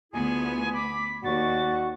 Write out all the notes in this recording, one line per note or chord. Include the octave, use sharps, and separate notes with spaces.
D2 B3 E4 F4 G#4 G#5
B5 D6 B6
D#2 F#4 D5 C#6 A6